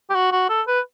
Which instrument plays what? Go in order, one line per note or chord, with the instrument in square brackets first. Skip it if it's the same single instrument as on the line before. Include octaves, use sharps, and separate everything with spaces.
[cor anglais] G4
F#4
F#4
A4
B4